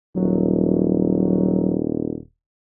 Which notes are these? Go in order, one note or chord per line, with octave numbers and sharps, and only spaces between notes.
D#1 F#3